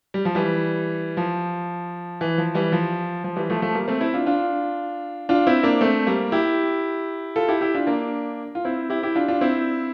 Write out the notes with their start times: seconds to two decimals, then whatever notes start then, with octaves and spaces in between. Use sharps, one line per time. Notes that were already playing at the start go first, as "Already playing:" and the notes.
0.14 G3
0.25 F3
0.35 E3 G3
1.17 F3
2.21 E3
2.38 F3
2.55 E3 G3
2.72 F3
3.24 F3
3.36 E3 G3
3.50 F3 A3
3.62 F3 A3
3.75 G3 A#3
3.88 A3 C4
4.01 C4 E4
4.14 D4 F4
4.26 D4 F4
5.29 D4 F4
5.47 C4 E4
5.63 A#3 D4
5.81 A3 C4
6.07 G3 A#3
6.32 E4 G4
7.36 F4 A4
7.48 E4 G4
7.61 E4 G4
7.75 D4 F4
7.87 A#3 D4
8.55 F4
8.65 C4 E4
8.90 E4 G4
9.03 E4 G4
9.15 D4 F4
9.28 D4 F4
9.41 C4 E4